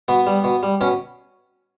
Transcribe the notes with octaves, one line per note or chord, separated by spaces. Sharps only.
B2 B3
G3
B2
G3
B2 C#4